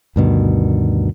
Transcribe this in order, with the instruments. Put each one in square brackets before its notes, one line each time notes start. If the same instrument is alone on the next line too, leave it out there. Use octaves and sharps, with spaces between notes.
[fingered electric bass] D2 G2 B2 D#3